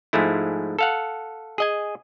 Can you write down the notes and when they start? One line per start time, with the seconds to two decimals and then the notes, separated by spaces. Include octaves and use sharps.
0.13 G#2 F3 G#3 A3 E4
0.79 A4 F5 F#5
1.58 G#4 D#5 G#5